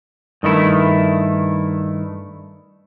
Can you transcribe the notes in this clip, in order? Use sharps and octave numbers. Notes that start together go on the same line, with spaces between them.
G2 D#3 A3 E4